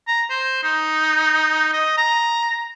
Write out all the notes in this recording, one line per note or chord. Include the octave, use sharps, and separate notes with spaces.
A#5
C5
D#4
D#5
A#5